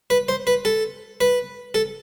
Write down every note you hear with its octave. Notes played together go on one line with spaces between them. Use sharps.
B4
C5
B4
A4
B4
A4